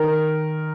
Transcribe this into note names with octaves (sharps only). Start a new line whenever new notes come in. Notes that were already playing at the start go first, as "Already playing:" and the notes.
Already playing: D#3 A#4